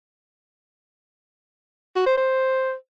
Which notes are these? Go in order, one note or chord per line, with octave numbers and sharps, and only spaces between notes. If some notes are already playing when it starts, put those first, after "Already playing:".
F#4
C5
C5